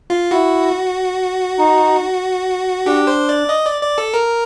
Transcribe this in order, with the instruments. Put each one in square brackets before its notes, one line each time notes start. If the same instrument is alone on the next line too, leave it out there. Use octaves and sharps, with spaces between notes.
[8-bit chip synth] F4
[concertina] E4 [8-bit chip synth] F#4
[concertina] D#4
[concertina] D4 [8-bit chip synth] G4
[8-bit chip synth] C5
D5
D#5
D5
D5
A4
A#4